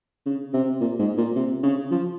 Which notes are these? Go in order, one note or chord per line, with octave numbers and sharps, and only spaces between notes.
C#3
C3
A#2
G#2
A#2
C3
C#3
F3